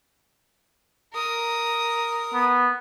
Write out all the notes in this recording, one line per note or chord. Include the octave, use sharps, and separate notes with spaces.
A#4 D#6
B3